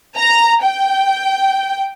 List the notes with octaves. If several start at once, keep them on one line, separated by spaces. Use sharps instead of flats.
A#5
G5